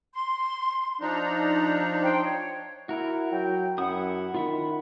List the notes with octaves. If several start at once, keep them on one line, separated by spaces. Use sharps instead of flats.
C6
F3 D4 D#4 A#5
C5 G5
C#5
E4 F#4 A#4
F#3 G5
F#2 E4 F#5 D#6
D#3 F4 E5 F#5 B5